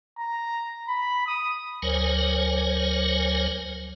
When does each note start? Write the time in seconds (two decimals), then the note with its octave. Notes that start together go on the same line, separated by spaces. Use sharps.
0.19 A#5
0.88 B5
1.27 D#6
1.82 D2 F#3 A#4 C5 C#5 G#5